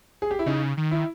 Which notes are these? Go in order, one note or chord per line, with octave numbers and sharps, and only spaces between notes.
G#4
G4
E4
C#3 D#4
D#3
E4